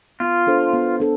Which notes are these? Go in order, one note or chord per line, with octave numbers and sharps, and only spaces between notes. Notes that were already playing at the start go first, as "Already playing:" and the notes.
B3 F4
D4 A4 C5
B3
D4 A4